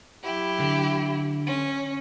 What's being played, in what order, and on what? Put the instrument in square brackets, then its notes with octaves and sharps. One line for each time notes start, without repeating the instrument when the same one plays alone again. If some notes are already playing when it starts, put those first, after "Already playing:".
[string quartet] F#3 E4 G4
[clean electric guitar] D3
[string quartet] C#4